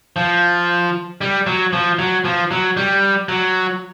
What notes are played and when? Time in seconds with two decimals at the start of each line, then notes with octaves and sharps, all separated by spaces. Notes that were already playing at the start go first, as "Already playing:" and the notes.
0.16 F3
1.21 G3
1.47 F#3
1.73 F3
1.99 F#3
2.25 F3
2.51 F#3
2.77 G3
3.29 F#3